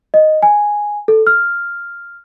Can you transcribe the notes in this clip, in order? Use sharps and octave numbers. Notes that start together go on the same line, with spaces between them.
D#5
G#5
A4
F6